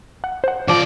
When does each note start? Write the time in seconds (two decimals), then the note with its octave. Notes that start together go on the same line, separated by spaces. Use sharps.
0.24 F#5
0.44 C5 F#5
0.68 C#3 F3 D5 D6